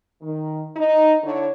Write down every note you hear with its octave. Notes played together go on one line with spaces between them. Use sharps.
D#3
D#4
D3 E4 C#5